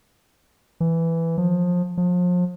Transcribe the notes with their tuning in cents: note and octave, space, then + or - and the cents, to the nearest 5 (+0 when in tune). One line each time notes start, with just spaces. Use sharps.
E3 +5
F3 +25
F3 +35